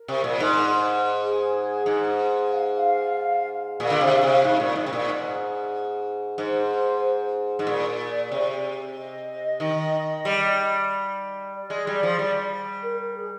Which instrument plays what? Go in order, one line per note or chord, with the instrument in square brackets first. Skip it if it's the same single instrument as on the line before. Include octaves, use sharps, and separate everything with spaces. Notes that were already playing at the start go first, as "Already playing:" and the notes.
Already playing: [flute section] A#4
[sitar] C3
A#2
G#2
[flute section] G#4
[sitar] G#2
[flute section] F5
F5
[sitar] A#2 [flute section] F5
[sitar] D3
C3
C3
G#2
A#2
G#2
C3
A#2
G#2
[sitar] G#2 [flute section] C5
[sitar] G#2
[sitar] A#2 [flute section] D5
[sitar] C3
[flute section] D#5
[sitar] D#3
G3
[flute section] D5
[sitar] G#3
G3
F3
G3
[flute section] A#4
A#4
G#4